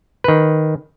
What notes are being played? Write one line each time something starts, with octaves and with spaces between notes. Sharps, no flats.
D#3 B4